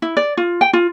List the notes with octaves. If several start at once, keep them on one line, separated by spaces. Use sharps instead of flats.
E4
D5
F4
G5
F4